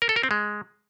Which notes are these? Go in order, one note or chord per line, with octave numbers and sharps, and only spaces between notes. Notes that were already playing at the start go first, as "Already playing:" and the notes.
A#4
A4
A#4
C4
G#3